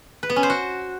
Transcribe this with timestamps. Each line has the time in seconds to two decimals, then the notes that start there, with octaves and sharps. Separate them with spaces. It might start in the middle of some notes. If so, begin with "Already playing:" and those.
0.23 B4
0.30 B3
0.36 C#4
0.43 C5
0.50 F#4